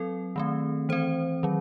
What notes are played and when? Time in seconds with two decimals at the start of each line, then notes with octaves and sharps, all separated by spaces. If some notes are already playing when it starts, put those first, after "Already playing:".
Already playing: F#3 C4 A4
0.36 D#3 A3 C4
0.89 E3 C4 C5
1.43 D#3 F#3